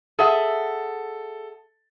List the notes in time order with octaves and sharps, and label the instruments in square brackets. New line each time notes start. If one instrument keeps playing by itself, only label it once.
[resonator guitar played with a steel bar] G#4 E5 F#5 [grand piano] A4